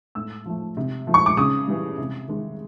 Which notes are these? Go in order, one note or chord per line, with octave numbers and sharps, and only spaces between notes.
A2 E6
F3 A3
C3
F3 A3
C#6
D6
C#3 D#6
E3 G3
C3
D#3 G#3